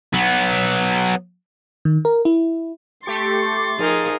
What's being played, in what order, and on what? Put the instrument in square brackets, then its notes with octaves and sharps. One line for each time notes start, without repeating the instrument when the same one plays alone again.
[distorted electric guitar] F#3 B3
[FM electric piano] D#3
A#4
E4
[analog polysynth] A3 G4 C#6 [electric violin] C6 A6
[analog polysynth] F3 [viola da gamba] D#4 G#4 A#4